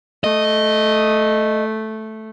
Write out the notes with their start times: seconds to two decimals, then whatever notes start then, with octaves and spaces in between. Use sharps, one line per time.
0.24 A3 D#5